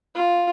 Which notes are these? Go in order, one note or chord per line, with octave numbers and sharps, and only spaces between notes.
F4